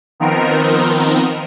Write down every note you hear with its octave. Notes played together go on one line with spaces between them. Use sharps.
D#3 F3 B3 C4 D#4 A#4